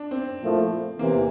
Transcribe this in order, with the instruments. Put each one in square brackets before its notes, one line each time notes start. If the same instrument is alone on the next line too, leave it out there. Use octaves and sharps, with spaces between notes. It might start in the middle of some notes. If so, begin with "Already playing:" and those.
Already playing: [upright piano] D4
C4
[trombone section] A#2 F3 A3 E4
[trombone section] E2 C3 E3 [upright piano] A#3